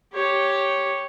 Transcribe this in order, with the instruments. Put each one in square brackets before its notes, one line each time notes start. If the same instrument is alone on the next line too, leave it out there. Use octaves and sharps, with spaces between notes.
[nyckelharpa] G4 C#5